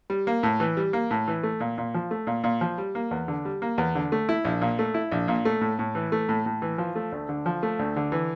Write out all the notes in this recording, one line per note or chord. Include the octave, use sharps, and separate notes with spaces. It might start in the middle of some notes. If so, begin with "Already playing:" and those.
G3
A#3
A2
E3
G3
A#3
A2
E3
A3
A#2
A#2
F3
A3
A#2
A#2
F3
G3
A#3
E2
D3
G3
A#3
E2
D3
A3
E4
A#1
A#2
A3
E4
A#1
A#2
A3
A2
A2
E3
A3
A2
A2
E3
F3
A3
D2
D3
F3
A3
D2
D3
E3